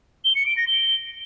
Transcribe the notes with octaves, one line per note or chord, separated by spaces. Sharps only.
G7
C#7
D7
A#6
G7